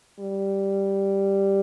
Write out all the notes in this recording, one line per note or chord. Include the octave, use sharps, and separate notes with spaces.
G3